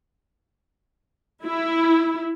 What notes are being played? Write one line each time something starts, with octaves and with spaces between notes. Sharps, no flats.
E4